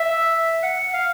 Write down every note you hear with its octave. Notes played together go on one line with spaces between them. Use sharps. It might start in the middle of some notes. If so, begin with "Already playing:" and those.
Already playing: E5
F#5
F5